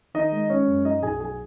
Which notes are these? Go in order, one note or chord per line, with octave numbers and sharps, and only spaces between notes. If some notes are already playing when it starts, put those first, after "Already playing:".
D#3 D#4 D#5
G#3
G#3 C#4 C#5
F#2
F#3 D#4 D#5
B1 G#4 G#5
F#3 G#4 G#5